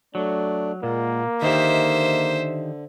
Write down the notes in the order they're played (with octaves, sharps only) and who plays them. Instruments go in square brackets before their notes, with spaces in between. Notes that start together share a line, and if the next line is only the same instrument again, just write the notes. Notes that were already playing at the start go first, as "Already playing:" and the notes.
[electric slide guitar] F#3 [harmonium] A3 D4 D5
[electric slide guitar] A#2 [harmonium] G#3 F4 F#5 [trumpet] A#3
[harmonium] D3 [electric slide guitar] D#3 D#4 G4 [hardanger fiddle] C5 E5